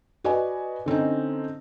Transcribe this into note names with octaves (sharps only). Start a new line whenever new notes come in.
F#4 B4 D5 D#5 G#5
D3 C4 C#4 D#4